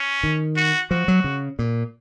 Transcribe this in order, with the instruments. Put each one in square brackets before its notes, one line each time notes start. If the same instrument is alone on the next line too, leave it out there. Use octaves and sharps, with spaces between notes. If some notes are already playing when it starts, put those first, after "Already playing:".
Already playing: [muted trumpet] C#4
[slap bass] D#3
[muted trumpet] F#4
[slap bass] F3 [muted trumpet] F#4
[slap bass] F#3
C#3
A#2